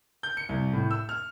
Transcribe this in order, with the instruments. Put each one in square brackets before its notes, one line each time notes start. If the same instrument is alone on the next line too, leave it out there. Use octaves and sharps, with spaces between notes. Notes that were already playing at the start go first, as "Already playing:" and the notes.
[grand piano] G6
C#7
C2
A2
E6
F6